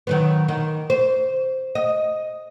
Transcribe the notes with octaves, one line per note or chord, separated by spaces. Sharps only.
D#3 F#3 B3
D#3
C5
D#5